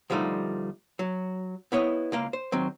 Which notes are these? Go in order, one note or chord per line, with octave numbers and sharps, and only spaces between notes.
D2 F3 G3 A3 D#4
F#3
B3 E4 C#5 D#5
C#2 A#3 F5
C5
D#3 F#3 C4